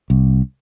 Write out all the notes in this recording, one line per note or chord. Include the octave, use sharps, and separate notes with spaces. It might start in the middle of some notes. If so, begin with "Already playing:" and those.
C2